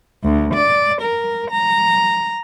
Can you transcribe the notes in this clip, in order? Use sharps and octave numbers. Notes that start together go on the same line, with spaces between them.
D2
D5
A#4
A#5